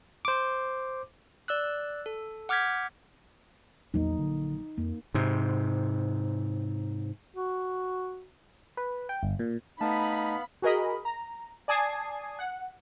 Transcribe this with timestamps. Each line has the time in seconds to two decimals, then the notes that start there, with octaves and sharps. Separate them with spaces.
0.25 C5 D6
1.48 D5 E6 F#6
2.06 A4
2.49 F#5 D6 F6 G6 G#6 B6
3.94 A#1 E2 F#3 A#3 D#4
4.19 D3
4.78 F2 A#3
5.14 G#2 C3
7.35 F#4
8.77 B4
9.09 G5
9.23 G1
9.39 A#2
9.81 A3 B3 D#4 F5 A5 B5
10.62 F#4 G#4 A#4 D#5 B5
11.05 A#5
11.68 D5 G#5 A5 D#6 G#6 C7
12.39 F#5